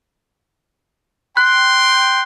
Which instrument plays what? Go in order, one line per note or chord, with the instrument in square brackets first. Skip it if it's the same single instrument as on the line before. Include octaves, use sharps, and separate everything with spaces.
[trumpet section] G5 C6 [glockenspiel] F#6